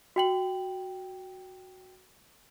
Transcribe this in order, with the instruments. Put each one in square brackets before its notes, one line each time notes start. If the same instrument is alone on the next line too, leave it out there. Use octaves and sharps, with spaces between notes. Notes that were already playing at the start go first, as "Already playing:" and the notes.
[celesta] F#4 G5 F#7